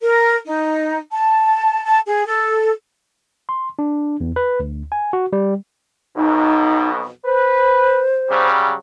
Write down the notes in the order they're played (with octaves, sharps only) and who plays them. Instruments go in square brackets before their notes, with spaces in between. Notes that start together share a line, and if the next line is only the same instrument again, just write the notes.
[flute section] A#4
D#4
A5
A5
G#4
A4
[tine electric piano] C6
D4
E2
B4
D2
G#5
F#4
G3
[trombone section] B1 F2 B2 [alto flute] D#4
[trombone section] B4 [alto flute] C5
[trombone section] C#3 F#3 G3